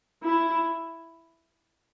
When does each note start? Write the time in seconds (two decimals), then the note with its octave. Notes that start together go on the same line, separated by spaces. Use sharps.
0.23 E4